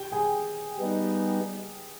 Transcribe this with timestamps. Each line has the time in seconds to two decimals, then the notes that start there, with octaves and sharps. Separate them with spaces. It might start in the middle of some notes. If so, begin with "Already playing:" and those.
Already playing: G4 G5
0.12 G#4 G#5
0.78 G3 B3 D#4